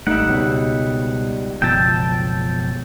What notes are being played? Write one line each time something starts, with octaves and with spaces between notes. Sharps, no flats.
G#1 E2 G3 A3 D#4 E5 F#5
C#2 B2
F#1 B2 F3 G5 A5 E6 A#6 D#7